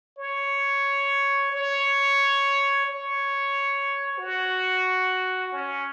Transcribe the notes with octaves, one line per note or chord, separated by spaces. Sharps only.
C#5
C#5
C#5
F#4
C#4